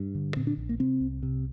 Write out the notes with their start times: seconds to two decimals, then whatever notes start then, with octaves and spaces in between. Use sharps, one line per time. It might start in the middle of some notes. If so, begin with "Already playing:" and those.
Already playing: G2
0.15 D3
0.36 A#2 C4
0.47 D4
0.57 A#1
0.69 A#3
0.79 C3 C4
1.01 C2
1.23 C3